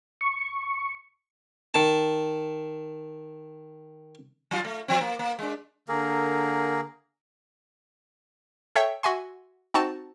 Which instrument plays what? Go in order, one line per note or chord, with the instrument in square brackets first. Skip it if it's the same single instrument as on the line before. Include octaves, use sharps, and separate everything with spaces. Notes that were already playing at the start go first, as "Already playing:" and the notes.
[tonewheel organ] C#6
[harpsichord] D#3 A5
[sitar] F#3 F4
A3
F3 C4
A#3
A#3
G#3 D4
[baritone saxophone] D3 [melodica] A#3 G#4 A#4
[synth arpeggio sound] A4 C#5 E5 G5
F#4 E5 G#5 C6
C4 D#4 F#4 A5